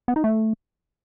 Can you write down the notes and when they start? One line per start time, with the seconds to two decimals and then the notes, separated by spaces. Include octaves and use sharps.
0.08 B3
0.16 D#4
0.24 A3